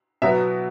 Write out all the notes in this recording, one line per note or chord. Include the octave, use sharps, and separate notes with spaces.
B2 F#3 B3 E5